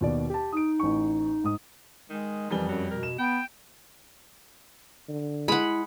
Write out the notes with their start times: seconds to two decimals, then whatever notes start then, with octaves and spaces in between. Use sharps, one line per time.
0.01 D#2 B2 D5
0.30 G4 A5
0.52 D#4 D#6 D7
0.80 A1 C#6
1.44 G#2 D#6
2.10 D#3 G#3
2.50 F2 E3 G3 G7
2.68 F#2 F#3
2.91 B2 A#4
3.03 E7
3.19 B3 G5
5.09 D3
5.48 G#3 E4 F#5 B5